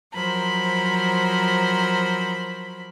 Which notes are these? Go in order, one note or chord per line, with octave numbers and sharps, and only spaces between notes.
F3 F#3 A#4 C5 B5